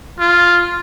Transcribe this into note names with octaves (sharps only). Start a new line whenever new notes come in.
F4